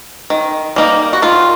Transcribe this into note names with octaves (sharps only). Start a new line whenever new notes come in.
D#3
G3 A#3 D#4
F#4
D#3 F4